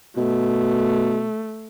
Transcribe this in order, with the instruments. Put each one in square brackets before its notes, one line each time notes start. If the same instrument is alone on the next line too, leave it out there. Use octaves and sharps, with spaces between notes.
[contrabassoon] B2 [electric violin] A3